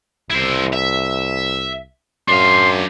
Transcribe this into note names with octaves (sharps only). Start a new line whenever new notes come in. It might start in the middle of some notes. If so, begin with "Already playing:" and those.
C2 E4 C5
E5
F#2 D4 F5 C6